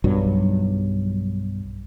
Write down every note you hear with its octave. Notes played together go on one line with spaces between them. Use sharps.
B1 G2 F#3